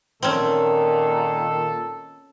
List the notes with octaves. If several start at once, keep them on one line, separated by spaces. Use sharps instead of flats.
A#2 D#3 C4 C#4 A4